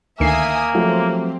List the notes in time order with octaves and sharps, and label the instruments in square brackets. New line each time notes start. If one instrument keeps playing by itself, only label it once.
[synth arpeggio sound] D2 D#3 C7 [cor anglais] A#3 [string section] E5 G#5 D#6
[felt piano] F3 F#3 A3 [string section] C4 G4